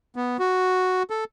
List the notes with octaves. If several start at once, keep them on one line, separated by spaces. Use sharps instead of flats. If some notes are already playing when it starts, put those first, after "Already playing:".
B3
F#4
A4